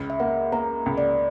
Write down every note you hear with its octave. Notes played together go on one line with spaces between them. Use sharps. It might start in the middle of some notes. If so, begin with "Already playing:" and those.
Already playing: C#2
E5
A#3 F#5
A#3 A#5
C#2
D5